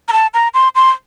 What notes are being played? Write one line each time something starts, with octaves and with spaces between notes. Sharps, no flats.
A#5
A5
A#5
C6
C6